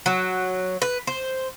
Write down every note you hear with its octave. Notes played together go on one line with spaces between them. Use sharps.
F#3
B4
C5